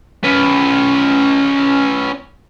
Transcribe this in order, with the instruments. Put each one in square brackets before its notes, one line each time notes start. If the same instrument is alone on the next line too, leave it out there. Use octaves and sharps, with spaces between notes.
[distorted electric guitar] C#4 B4